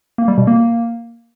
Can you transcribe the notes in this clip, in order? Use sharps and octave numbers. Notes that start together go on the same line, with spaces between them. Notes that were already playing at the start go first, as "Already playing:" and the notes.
A#3
G3
B2
A#3